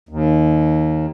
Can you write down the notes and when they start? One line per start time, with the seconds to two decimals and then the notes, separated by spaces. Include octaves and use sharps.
0.09 D#2